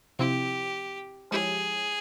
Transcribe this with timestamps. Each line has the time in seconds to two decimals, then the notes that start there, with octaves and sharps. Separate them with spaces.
0.19 C3 F3 C4 E4 G4
1.31 F3 G#3 E4 G4 G#4 C#5